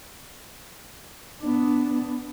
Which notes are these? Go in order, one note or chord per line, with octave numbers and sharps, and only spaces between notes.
B3 D4